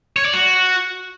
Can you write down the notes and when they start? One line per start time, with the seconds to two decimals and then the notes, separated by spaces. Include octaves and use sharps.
0.16 C#5
0.25 D5
0.33 F#4